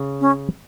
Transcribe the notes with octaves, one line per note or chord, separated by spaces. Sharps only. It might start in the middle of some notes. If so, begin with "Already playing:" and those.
Already playing: C#3
C#4